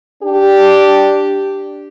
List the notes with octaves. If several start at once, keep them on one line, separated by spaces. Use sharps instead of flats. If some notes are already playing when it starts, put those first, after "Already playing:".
D4 G4